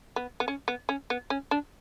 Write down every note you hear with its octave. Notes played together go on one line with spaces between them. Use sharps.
B3
B3
C#4
B3
C#4
B3
C#4
D4